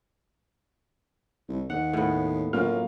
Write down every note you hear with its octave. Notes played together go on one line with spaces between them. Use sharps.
C2
D#2 F#5
A2 B3
F#2 A#3 F4 F6